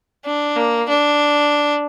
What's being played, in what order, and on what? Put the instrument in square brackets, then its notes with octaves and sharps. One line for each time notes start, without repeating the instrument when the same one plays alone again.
[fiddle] D4
A#3
D4